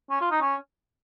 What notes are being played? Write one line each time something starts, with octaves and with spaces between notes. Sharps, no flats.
C#4
F4
D#4
C#4